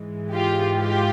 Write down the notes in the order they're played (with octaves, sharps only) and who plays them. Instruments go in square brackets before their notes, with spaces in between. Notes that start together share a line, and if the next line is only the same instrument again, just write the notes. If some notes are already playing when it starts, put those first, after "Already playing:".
Already playing: [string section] G#2 E3 G#3
F4 G4
F4 G4